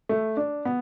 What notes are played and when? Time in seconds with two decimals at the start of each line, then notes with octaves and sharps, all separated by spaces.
0.09 A3
0.37 D4
0.65 B3